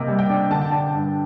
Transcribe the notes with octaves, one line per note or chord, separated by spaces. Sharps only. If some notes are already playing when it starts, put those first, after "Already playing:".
Already playing: C3 A#3 D#5 G5
G3
G5
D4
D3 A5
G5
D4 A5
G2